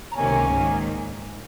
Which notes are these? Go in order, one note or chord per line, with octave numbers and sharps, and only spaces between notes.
A#5
C#2 C3 D#3 A#3 C#4 G#5
G#2 D#3 A#3